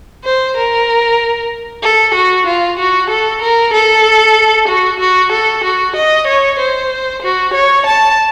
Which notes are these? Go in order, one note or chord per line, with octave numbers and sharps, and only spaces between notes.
C5
A#4
A4
F#4
F4
F#4
A4
A#4
A4
F#4
F#4
A4
F#4
D#5
C#5
C5
F#4
C#5
A5